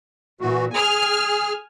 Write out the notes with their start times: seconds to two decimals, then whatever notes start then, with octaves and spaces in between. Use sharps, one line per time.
0.41 A#2 E3 F#4
0.75 G#4 G#5 F6